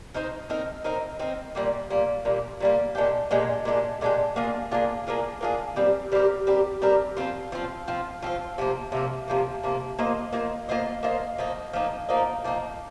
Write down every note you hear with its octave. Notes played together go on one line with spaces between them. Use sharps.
C4 D#4 A#4
C4 D#4 A#4
C4 D#4 A#4
C4 D#4 A#4
A#2 G3 A#3
A#2 G3 A#3
A#2 G3 A#3
A#2 G3 A#3
A#2 G#3 D4 G4
A#2 G#3 D4 G4
A#2 G#3 D4 G4
A#2 G#3 D4 G4
A#3 D4 F4 G#4
A#3 D4 F4 G#4
A#3 D4 F4 G#4
A#3 D4 F4 G#4
G3 C4 G4 A#4
G3 C4 G4 A#4
G3 C4 G4 A#4
G3 C4 G4 A#4
F3 C4 F4
F3 C4 F4
F3 C4 F4
F3 C4 F4
C3 F3 A#3
C3 F3 A#3
C3 F3 A#3
C3 F3 A#3
A#3 F4 C5 D#5
A#3 F4 C5 D#5
A#3 F4 C5 D#5
A#3 F4 C5 D#5
F3 A#3 D#4
F3 A#3 D#4
F3 A#3 D#4
F3 A#3 D#4